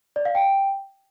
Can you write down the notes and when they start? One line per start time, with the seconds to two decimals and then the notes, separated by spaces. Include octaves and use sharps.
0.16 D5
0.25 F5
0.35 G5